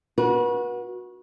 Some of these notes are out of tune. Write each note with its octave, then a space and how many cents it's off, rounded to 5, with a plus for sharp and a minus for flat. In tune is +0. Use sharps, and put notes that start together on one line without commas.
F#4 -15 B4 -40